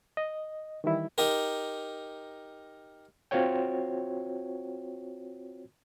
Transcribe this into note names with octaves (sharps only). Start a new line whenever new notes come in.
D#5
D#3 E3 G3 E4
D#4 G4 A#4
C4 F4 F#4 C5 C#5 G5